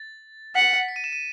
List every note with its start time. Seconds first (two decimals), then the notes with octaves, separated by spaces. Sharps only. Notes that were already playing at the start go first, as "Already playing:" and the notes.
Already playing: A6
0.55 F#5 B6
0.88 C#7
0.96 D#7
1.04 E7
1.12 D#7